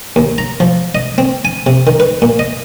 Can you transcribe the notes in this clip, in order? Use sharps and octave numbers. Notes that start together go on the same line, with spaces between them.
D#2
A#5
F3
D#5
C4
G#5
C3
D#3
B4
A#2
D#5